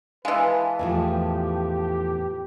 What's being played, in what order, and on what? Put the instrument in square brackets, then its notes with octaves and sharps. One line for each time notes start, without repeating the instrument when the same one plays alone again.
[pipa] E3 G#3 [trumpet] B4 [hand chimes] F5 A5
[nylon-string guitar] E2 A2 F3 [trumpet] G4